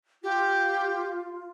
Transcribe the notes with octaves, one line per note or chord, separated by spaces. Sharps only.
F4 G4